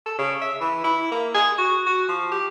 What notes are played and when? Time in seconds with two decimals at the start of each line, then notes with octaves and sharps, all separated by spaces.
0.06 A4
0.19 C#3
0.42 E5
0.61 E3
0.84 E4
1.12 A#3
1.34 G#4
1.58 F#4
1.86 F#4
2.09 F3
2.32 G4